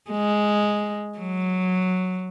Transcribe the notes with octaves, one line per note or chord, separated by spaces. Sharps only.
G#3
F#3